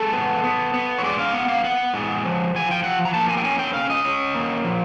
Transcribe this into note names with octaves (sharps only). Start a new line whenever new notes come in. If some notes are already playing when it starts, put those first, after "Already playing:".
Already playing: G#3 A4
B3
B3
B3
C#5
G#3 D5
F5
B3 F#5
F5
B3 F#5
G#3
F3
F3 G#5
G5
F3 F#5
A#5
A#3 A5
G#5
G5
C#4 G#5
G5
C#4 F5
D#5
C#4
A#3
F3